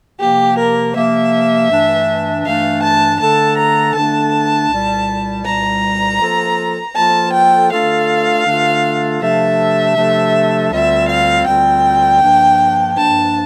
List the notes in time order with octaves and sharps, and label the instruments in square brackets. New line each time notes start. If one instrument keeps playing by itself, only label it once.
[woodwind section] C3 F3 A#3 [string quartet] G4
[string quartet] A#4
[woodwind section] C3 F3 A#3 [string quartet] E5
[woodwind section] G2 E3 A3 D4
[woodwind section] G2 E3 A3 D4 [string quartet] F5
[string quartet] A5
[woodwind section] D3 A3 D4 A4 [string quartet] A5
[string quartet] A#5
[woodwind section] D3 A3 D4 A4 [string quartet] A5
[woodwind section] C2 A#2 G3
[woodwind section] C2 A#2 G3 [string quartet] A#5
[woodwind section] F3 A#3 F4 A4
[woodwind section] F3 A#3 F4 A4 [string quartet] A5
[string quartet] G5
[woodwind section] D3 A3 D4 F4 A4 [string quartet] F5
[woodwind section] D3 A3 D4 F4 A4
[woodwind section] C3 F3 A3 D4 A4 [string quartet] E5
[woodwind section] C3 F3 A3 D4 A4
[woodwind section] D2 D3 G3 C4 F4 [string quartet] E5
[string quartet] F5
[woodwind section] D2 D3 G3 C4 F4 [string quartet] G5
[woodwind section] G2 F3 A#3 D4
[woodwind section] G2 F3 A#3 D4 [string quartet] A5